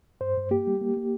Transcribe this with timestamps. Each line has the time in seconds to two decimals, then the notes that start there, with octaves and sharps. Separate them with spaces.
0.21 G2 C5
0.37 G2
0.51 A#3 G4
0.67 G3
0.81 A#3
0.97 A#3